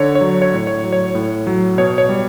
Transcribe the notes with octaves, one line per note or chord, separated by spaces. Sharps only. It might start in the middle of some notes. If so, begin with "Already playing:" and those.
Already playing: D3 C#5
C#5
F#3
C#5
A2
C#5
F#3
C#5
A2
F#3
B2 C#5
C#5
G3